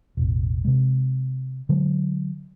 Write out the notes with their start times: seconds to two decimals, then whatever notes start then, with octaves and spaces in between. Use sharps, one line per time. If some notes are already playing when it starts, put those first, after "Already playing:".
0.17 E1 A1
0.64 C3 G#3
1.69 D3 F#3 G#3